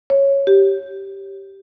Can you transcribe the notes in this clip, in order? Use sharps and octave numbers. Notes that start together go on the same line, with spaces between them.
C#5
G4